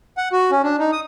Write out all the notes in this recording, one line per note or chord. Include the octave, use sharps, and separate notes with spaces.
F#5
F#4
C#4
D4
D#4
D#6